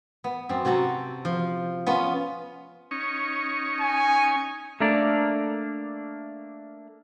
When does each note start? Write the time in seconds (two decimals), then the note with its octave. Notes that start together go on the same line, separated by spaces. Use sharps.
0.24 B3
0.49 F#2 C4
0.65 C3 F#4 A4 A#5
1.25 F3
1.87 B3 C#4 F4
2.91 C#4 D#4 C#6
3.81 G#5
4.80 A3 A#3 D4 A#4 D5